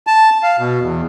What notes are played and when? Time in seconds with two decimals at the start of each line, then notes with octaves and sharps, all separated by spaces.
0.07 A5
0.43 F5
0.59 B2
0.81 E2